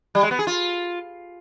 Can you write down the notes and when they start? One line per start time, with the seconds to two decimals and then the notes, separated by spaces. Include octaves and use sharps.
0.15 G3
0.23 G#3
0.31 B3
0.39 G#4
0.47 F4